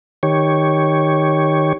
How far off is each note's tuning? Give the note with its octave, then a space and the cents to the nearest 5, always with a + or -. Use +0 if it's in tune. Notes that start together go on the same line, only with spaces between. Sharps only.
D#3 -5 G4 +0 C#5 +0